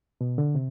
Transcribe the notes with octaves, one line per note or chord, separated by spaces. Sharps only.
B2
D3
C3